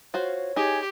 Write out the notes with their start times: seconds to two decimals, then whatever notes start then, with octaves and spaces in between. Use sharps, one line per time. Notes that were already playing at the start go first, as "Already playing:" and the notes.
0.14 F4 F#4 C5 C#5
0.56 D#4 G4 G#4 G#5